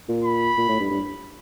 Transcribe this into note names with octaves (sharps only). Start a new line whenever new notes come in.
A#2
B5
A#2
A2
G2
G2